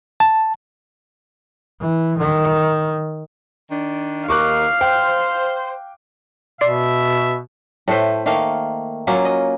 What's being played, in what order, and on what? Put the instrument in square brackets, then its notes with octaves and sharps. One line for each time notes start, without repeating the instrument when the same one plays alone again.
[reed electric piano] A5
[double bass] E3
D#3
[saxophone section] D#3 D4
[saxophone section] D#2 D#4 A#4 [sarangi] F5 [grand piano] C#6 D6 F#6
[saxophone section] C5 [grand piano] G5
[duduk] B2 [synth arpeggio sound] D5 C6 C7 [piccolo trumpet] E5
[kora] A2 A3 B4 C5
D#3 A3 A#3 F5
F#3 A#3 C#4 F4
D#5